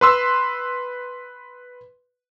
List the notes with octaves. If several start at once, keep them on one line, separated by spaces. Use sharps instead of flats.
B4 C6 E6